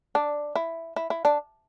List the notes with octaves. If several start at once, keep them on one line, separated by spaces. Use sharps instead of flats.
D4
E4
E4
E4
D4